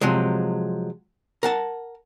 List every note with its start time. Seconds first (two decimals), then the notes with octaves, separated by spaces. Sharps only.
0.01 C3 F3 F#3 G#3
1.43 A#4 F#5 A5